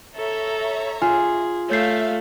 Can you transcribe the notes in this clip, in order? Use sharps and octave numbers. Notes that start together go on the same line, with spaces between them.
A4 C#5 E5 A#5
F4 G#4 G#5
A3 C#5 E5 F5 G6 C7